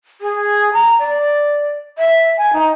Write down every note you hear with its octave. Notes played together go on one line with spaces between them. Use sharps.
G#4
A#5
D5
E5
G#5
D#4